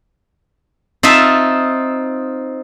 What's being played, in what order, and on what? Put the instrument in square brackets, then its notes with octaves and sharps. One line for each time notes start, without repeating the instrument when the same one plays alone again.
[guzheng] C4 D#4 F4 E5 A5